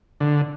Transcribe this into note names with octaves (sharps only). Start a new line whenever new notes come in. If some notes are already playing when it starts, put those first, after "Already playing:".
D3